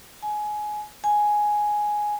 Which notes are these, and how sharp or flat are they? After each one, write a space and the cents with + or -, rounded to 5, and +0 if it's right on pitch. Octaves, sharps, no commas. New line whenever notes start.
G#5 +20
G#5 +5